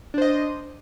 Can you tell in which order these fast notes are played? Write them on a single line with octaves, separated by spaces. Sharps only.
D4 C5 D#5